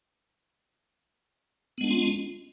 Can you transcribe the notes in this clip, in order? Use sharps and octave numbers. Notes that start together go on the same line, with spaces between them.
G#3 B3 C#4 D4 F4